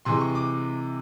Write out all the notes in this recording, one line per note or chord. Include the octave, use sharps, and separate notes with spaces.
C3 E3 G#3 C6
C#6
D6